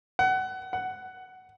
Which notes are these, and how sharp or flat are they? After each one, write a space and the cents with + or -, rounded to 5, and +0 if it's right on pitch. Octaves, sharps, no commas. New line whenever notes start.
F#5 +25
F#5 +10